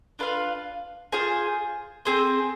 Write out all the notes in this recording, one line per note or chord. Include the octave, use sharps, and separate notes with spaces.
D4 F4 B4 F5
F4 G#4 C5 G#5
C4 G#4 C5